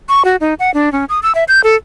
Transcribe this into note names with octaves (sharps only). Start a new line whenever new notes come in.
C#6
F#4
D#4
F#5
D4
C#4
D#6
E6
E5
G6
A4